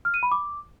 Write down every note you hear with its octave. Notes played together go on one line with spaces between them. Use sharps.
F6
D#7
B5
D6